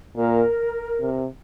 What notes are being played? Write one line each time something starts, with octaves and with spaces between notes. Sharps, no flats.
A#2 A#4
C3